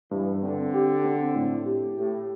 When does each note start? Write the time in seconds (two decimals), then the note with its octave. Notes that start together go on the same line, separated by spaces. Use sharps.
0.11 G2 E3
0.43 D3 C4
0.74 G4
1.04 C4
1.35 A2
1.66 G4
1.97 A2 G4